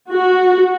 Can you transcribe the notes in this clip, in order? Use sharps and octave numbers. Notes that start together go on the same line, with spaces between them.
F#4